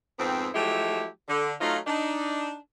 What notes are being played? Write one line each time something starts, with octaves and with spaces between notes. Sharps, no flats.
F2 G#2 B3 C4
F3 F#3 G#3 A3 E4 G4
D3
F#3 A3 D#4 F4
D4 D#4